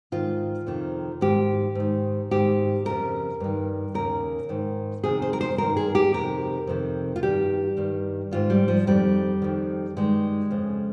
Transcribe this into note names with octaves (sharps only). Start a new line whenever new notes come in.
G#2 D#3 F4
F2 C3 D#3
G#2 D#3 G4
G#2 D#3
G#2 D#3 G4
F2 C#3 A#4
G2 D#3
D#2 C#3 A#4
G#2 D#3
F2 C3 D#3 G#4
C5
A#4
C5
G2 D#3 A#4
G#4
G4
F2 C3 D#3 A#4
F2 C3 D#3
F4
G2 D#3 G4
G2 D#3
G#2 D#3 F4
G3
F3
F2 D#3 G3
F2 D#3
G2 D#3 G#3
F2 C#3